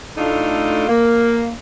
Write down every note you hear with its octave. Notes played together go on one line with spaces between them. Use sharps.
A2 A3 D4 D#4 F4 A4
A#3